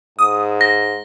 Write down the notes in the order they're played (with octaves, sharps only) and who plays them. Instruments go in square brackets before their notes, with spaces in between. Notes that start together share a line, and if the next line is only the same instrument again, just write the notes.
[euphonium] G#2 [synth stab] D#6
[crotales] A#6